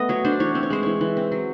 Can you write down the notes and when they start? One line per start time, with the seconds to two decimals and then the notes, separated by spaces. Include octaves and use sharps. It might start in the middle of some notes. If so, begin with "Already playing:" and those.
Already playing: A3 B3 D#5
0.09 F#3 C#5
0.25 D4 C5
0.40 E3 C#5
0.55 C4
0.63 C#5
0.70 G#3 C5
0.83 E3 C#5
1.01 E3
1.17 C4
1.32 F#3